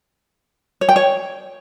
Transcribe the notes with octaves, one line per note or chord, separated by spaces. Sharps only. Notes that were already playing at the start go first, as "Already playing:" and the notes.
C#5
G5
C#5